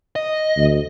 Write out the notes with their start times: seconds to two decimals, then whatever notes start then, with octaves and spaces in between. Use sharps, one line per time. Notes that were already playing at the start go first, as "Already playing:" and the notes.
0.16 D#5
0.57 D2